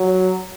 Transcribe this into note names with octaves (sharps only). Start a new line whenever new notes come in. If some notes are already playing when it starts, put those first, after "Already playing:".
Already playing: F#3